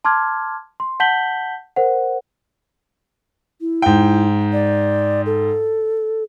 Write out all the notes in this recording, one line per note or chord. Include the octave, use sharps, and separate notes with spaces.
A5 C6 D6 F6 G#6
C6
F#5 A5 G6 B6 F#7 G7
A#4 C5 F#5
E4
G#2 G5
D5
A4